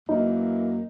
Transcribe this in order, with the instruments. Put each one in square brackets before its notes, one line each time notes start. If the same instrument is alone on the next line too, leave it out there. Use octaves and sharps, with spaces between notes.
[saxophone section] F#2 E3 A#3 [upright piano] D#4